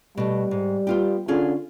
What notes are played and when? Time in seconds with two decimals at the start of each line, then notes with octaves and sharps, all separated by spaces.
0.17 B2 G3 A3
0.51 G#2
0.87 B3 F4 G4
1.28 D3 C#4 F4 G#4